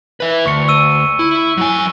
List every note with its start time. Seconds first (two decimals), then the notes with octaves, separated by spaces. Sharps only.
0.20 B4 E5
0.46 D2 C#6 C#7
0.68 C#6 E6 D#7
1.19 E4
1.57 F#3 G#5